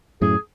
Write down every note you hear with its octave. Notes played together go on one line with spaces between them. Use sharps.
F#2 A2 G#4